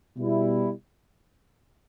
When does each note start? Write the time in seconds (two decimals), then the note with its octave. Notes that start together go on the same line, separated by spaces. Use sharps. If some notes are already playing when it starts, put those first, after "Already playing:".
0.17 B2 G3 B3 E4